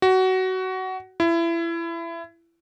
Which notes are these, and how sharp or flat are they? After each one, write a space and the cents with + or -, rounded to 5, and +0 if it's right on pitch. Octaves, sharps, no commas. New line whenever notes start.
F#4 +20
E4 +25